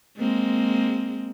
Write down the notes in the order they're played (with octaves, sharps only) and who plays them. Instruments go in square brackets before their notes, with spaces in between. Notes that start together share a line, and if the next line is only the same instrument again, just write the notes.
[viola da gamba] G#3 A#3 C4